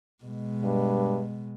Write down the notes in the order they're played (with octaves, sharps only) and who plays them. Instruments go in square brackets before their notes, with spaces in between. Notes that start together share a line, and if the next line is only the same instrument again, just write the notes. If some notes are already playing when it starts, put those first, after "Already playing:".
[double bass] B2 G#3
[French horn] G2